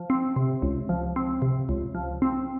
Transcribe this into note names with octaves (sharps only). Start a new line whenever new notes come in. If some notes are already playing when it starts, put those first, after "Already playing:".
Already playing: F3
C4
C3
C#2
F3
C4
C3
C#2
F3
C4